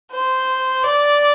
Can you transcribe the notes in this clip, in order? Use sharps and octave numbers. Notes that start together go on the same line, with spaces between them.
C5
D5